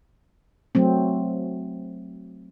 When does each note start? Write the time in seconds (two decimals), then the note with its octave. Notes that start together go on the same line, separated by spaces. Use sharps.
0.75 F#3 A3 C4